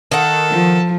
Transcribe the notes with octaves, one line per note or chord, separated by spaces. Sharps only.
D#3 A4 F#5
F3